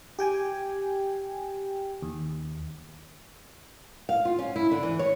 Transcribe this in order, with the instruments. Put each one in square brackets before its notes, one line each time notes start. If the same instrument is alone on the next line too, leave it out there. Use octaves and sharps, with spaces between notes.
[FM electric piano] G4 G5 G#5
D#2
[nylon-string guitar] F5
F4
C#4
E4
D3
E3
C#5